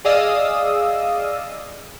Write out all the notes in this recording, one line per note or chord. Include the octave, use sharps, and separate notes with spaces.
G#4 D5 D#5 F5 D#6 E6